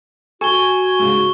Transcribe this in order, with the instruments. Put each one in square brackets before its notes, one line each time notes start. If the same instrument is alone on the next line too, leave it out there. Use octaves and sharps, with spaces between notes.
[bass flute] F#4 [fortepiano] A4 [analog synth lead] G#5 [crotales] C#6 G7
[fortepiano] G#2 C#3